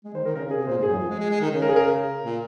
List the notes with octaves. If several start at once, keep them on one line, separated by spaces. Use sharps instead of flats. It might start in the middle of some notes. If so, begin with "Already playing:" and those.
G#3
D#3 C5
D#3 A#4
C#3 A#4
C#3
G#4
C3
A#2 C5
G#2
F#2 G#4
F3
G#3
G#3
G#3
D#3
C#3
A#4
G#4
A#4
A#2